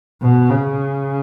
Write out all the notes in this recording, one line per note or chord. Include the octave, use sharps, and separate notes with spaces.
B2
C#3